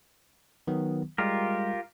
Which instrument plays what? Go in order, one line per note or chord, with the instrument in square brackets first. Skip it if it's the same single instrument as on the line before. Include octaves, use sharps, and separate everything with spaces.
[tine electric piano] D#3 F#3 B3
[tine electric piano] G3 G#3 [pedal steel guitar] F4 G4 A#4